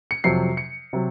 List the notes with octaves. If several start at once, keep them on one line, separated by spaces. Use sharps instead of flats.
C#7
F2 C3 F#3 C7
C#7
C3 F#3